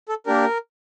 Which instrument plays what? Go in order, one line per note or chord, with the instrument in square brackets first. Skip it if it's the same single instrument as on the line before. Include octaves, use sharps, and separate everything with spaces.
[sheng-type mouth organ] A4
A#3 D4 G4 A#4